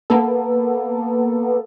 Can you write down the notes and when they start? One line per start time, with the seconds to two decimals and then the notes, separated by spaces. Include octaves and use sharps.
0.10 A#3 B3 A4